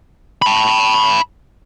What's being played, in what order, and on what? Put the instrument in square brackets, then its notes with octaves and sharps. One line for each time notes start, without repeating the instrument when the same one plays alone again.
[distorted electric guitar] A5 B5